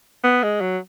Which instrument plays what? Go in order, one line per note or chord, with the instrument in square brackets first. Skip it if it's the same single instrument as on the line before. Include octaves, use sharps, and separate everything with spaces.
[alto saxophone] B3
G#3
F#3